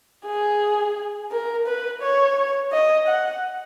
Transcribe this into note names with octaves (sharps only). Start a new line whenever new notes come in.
G#4
A#4
B4
C#5
D#5
F#5